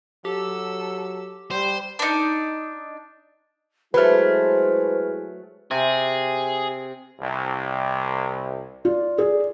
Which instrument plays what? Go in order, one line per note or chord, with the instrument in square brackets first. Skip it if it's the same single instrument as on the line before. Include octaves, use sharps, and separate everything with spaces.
[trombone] F#3 [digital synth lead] G4 [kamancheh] A4 E6
[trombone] G3 [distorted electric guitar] C5
[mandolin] D4 D#4
[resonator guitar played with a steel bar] F#3 A3 [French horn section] G#3 E4 G#4 [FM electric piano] B4 F6 [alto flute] C5
[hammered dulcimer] C3 [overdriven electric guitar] G#4
[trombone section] C2
[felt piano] F4 [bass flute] D5
[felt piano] G#4